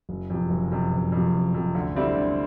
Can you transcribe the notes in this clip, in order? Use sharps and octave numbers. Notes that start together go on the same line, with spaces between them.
F#1
F2 C3
F#1
F2 C3
F#1
F2 C3
F#1
F2 C3
D2
D3 G3 C4 E4
D2